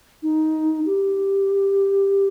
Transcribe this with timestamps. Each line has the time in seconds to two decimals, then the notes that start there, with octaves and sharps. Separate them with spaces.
0.23 D#4
0.86 G4